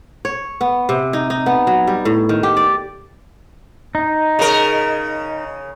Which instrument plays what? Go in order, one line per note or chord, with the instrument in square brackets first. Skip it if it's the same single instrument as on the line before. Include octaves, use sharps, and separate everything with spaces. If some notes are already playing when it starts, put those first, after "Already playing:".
[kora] C#5
B3
C3
D#4
D#4
B3
F#3
G3
A2
D#3
G4
D5
[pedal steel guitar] D#4
[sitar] C#3 A#4